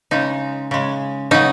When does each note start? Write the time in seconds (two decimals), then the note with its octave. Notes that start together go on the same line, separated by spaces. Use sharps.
0.11 C#3 G#3 D#4
0.71 C#3 G#3
1.31 C#3 F#3 D#4